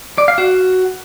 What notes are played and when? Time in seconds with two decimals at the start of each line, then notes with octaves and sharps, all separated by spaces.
0.18 D5
0.28 F5
0.38 F#4